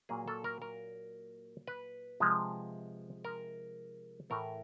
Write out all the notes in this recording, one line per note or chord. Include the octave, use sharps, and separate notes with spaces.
A#2 F#3 A#3 G#4
A4
A#4
A#4
B4
C3 F3 G#3
A#4
A2 E3 A3 A#4